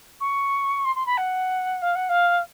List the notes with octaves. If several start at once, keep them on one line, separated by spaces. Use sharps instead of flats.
C#6
C6
C6
B5
F#5
F5
F#5
F5